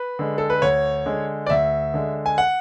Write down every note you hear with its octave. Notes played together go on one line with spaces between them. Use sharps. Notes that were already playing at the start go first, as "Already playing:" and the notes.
Already playing: B4
D3 G#3
A4
B4
D2 C#5
D3 G#3
D5
D2 E5
D3 G#3
G#5
F#5